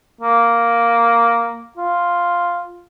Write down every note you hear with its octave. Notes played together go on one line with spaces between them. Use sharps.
A#3
F4